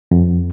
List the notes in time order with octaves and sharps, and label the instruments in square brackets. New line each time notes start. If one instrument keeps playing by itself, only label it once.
[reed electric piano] F2